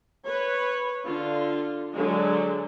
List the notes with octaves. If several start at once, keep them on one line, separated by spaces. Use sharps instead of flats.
B4 C#5
D3 F4
D3 F#3 G#3